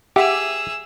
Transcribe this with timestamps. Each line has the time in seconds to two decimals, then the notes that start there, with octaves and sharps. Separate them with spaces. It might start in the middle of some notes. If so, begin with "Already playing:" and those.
0.16 G4 G#4 E5 F#5 D6 E6